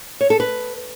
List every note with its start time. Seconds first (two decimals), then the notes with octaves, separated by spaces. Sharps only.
0.21 C#5
0.30 A4
0.40 B4